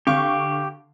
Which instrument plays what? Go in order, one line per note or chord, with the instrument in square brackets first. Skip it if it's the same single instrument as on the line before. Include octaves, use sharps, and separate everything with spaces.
[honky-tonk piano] D3 F5 C#6 [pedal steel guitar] G4